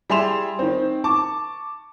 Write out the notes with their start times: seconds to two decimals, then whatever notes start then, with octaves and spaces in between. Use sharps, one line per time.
0.10 G3 E4 G#4 C6 E7 F7
0.59 D#3 C4
1.04 A5 C#6 D6